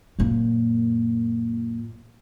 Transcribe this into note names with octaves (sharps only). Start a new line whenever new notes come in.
F#2 A#2